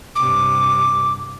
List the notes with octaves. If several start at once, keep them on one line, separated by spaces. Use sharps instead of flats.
G2 C3 D6